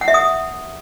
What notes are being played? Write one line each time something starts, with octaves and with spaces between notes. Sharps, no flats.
F#5
E5
D#6